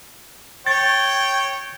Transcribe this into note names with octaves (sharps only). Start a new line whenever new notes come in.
C#5 G5 A6